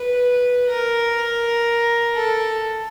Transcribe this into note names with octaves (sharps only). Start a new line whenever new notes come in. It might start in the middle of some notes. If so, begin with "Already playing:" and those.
Already playing: B4
A#4
A4